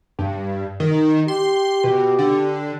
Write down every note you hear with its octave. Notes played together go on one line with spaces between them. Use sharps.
G2
D#3
G4 C6
B2
D3